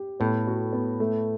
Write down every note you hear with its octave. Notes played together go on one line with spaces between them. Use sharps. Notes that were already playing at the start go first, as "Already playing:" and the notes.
Already playing: G4
A2 B3
F#4
B3
A3